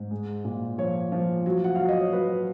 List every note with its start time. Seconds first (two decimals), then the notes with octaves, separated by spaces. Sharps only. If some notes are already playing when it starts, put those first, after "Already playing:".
Already playing: G#2
0.11 G#3
0.45 A#2
0.78 F3 C#5
1.12 F3
1.46 F#3
1.64 F#5
1.76 F#3 F5
1.89 D#5
2.00 C#5
2.12 F#3 B4